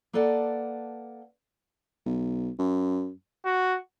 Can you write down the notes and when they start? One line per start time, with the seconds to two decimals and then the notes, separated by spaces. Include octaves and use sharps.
0.13 A#3 A4 B4 D5 F#5 A5
2.06 B1
2.59 F#2
3.45 F#4